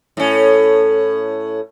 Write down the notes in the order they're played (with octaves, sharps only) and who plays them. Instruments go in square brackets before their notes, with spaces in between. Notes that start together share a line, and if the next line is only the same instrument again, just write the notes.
[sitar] A2 C#4